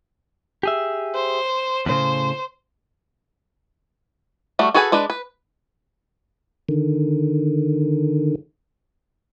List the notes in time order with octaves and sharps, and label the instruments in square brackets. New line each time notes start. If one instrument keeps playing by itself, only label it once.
[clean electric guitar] G4 G#4 E5
[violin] C5
[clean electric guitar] E2 A2 C#3 [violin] C5
[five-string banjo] G3 A3 F#4
F#4 G#4 A4 B4 G#5
G#3 D4 B4
B4
[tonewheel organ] D3 D#3